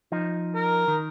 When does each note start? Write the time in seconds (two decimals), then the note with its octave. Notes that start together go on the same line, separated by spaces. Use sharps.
0.12 F3 D#4
0.54 A#4
0.88 D#3